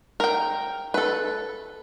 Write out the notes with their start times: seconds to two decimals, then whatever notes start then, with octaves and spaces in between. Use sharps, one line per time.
0.20 A#4 G5
0.94 A4 B4